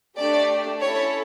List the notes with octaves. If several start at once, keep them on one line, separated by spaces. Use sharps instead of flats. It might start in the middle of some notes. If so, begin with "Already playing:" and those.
A3 D4 G4 D5
C#4 E4 A4 C#5